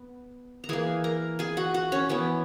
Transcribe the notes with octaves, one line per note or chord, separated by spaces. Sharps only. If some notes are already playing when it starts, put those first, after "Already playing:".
Already playing: B3
A#5
E3 A#3 G#4 G#5
A#4 A#5
G#4 G#5
F#4 F#5
F#4 F#5
C#4 C#5
E3 B3 C#4 C#5